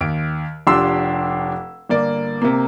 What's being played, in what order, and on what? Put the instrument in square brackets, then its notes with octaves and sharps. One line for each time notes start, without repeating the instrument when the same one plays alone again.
[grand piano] D#2 D7
F1 D4 F4 G4 C6 E6
G1 A#3 D5
C3 A#3